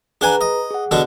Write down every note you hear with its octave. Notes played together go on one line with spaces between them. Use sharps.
D4 G#4 B4 F#5 G#5 A#5
D#5
G#4 F#5
B2 D3 D4